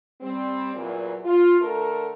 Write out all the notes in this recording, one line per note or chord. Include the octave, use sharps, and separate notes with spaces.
G3 C4
E2 A#2 F#3
F4
D3 A3 A4 A#4